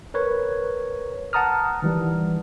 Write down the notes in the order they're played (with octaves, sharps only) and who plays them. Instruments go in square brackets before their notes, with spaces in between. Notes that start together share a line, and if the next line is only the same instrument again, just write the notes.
[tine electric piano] A#4 B4 C#5
F#5 A5 A#5 D#6 F6
D#3 E3 G3